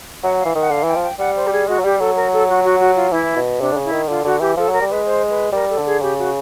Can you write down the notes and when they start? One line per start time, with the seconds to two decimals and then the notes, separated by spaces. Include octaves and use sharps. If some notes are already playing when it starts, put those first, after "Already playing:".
0.23 F#3 F#5
0.40 F5
0.45 E3
0.55 D#3
0.61 F#5
0.71 D3 F5
0.83 E3 G5
0.95 F3
1.03 G5
1.19 G3 F#5
1.36 C5
1.47 G4
1.52 G#4
1.68 G#3 F#4
1.79 F#3
1.84 G3 G4
1.99 F#3 A4
2.16 A#4
2.32 A4
2.49 F#4
2.64 F#4
2.80 F#4
2.96 F4
3.12 E3 E4
3.36 B2
3.61 C3 D4
3.73 D3
3.77 C#3
3.84 E4
3.92 D#3
4.09 D3 F4
4.25 D3 F#4
4.41 E3 G4
4.57 F3 A4
4.69 F#3 A#4
4.81 G3
4.89 G#3 B4
5.05 C5
5.30 B4
5.53 G3 A#4
5.69 A4
5.78 D3
5.86 G#4
6.02 C#3 G4
6.18 F#4